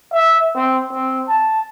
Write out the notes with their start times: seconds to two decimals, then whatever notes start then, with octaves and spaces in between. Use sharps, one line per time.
0.13 E5
0.55 C4
0.92 C4
1.28 A5